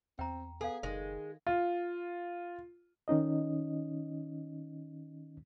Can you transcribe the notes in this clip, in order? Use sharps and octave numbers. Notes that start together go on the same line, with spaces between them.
E2 C4 G5 A#5
B3 G#4 A4 F5
F#1 D#3 G#3
F4
D#3 C#4 D#4 D#5